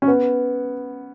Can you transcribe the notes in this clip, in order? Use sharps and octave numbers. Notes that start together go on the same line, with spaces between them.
C#4
B3